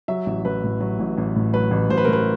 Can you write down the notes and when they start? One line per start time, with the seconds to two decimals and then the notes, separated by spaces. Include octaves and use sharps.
0.08 F#3 E5
0.26 A1
0.45 A1 B4
0.63 A2
0.81 F#3
0.99 A1
1.17 A1
1.36 A2
1.53 F#3 B4
1.71 A1
1.90 A1 C5
1.97 B4
2.05 A#4
2.08 A2
2.13 B4